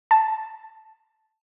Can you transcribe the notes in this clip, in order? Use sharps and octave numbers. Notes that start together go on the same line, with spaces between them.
A5